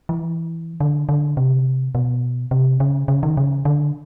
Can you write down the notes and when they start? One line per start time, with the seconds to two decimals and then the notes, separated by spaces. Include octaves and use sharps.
0.09 E3
0.80 D3
1.09 D3
1.37 C3
1.95 B2
2.51 C3
2.80 C#3
3.08 C#3
3.23 D#3
3.37 C#3
3.65 D3